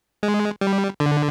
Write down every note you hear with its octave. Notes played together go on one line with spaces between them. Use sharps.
G#3
G3
D3